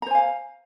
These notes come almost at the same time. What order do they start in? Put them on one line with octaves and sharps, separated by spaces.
A#5 C5 G#5 F5